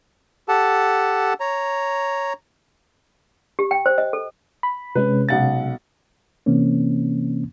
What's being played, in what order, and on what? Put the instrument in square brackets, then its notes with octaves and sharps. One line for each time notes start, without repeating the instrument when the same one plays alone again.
[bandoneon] G4 A4 F#5 A5
C#5 A#5
[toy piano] G4
G5
C5
D#5
A4
[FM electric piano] B5
[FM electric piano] C3 G#3 C#4 [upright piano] B4
[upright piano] B1 F#5 A6
[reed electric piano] C3 E3 A#3 C4 C#4